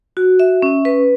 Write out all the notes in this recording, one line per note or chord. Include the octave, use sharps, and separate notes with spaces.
F#4
E5
C#4
B4